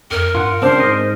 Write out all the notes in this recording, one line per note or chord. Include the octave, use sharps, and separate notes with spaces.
F2 A#4
G2 F4 F#5
C#2 C4 D4 C5
G#2 D#5